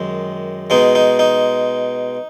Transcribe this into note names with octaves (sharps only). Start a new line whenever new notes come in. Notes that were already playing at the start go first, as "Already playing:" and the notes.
Already playing: F#2 D#3 G#3
B2 G#3 D#4
D#4
D#4